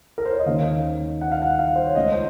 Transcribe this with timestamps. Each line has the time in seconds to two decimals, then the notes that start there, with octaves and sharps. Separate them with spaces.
0.18 A#4
0.25 C5
0.32 C#5
0.39 D#5
0.46 D#2 D#3 A#3 C#4 F5
1.21 F#5
1.32 F5
1.42 F#5
1.59 F5
1.76 C5
1.86 C#5
1.95 C#2 C#3 A3 C#4 D#5
2.12 C5